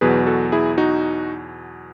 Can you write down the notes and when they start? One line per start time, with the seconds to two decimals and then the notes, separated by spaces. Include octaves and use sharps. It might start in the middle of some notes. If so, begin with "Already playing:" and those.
0.01 E2 B2 F#3 G#4 B4
0.26 F#4 A4
0.52 E4 G#4
0.78 D#4 F#4